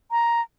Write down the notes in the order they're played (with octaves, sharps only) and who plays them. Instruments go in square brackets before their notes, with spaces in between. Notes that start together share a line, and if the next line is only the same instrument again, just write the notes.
[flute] A#5